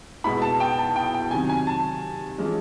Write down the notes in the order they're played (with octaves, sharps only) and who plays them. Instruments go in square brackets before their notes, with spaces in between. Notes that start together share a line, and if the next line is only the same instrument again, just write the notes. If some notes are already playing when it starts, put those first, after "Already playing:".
[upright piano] B2 G#3 B3 E4 [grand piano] B5
[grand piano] A5
G5
A5
G5
G5
[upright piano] C3 D#3 F#3 [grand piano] G#5
[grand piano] G#5
A5
[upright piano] E3 G#3 C#4 F4